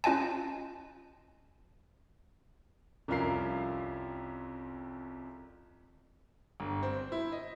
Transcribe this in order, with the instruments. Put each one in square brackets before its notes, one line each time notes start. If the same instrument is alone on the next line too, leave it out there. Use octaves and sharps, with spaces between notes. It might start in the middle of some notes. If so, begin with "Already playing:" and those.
[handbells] C#4 F4 D#5 G#5 A5
[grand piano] C2 F2 C#4 F4 A#4 C7
G1
C4
C5
E4
D#5